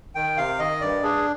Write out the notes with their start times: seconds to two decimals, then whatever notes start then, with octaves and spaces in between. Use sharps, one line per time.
0.15 D#3 G5
0.37 C3 F5
0.59 D#3 D#5
0.81 G2 D5
1.03 D4 G#4